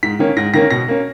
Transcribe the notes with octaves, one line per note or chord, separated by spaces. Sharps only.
G#2 B6
D#3 A#3 C#4
G#2 A#6
D#3 A#3 C#4 A#6
B2 A#6
A#3 C#4